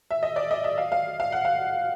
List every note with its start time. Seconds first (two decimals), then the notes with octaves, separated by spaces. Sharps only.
0.11 E5
0.23 D#5
0.36 D5
0.51 D#5
0.64 E5
0.78 F5
0.92 F5
1.20 F5
1.32 F#5
1.45 F5